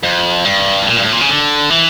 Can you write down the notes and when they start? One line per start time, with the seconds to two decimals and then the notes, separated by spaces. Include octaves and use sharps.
0.03 F2
0.45 G2
0.82 A2
0.87 A#2
0.96 G2
1.04 A2
1.13 A#2
1.21 C#3
1.29 D3
1.70 E3